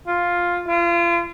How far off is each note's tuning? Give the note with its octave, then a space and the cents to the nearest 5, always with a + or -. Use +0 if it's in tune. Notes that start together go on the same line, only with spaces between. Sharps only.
F4 +5
F4 -35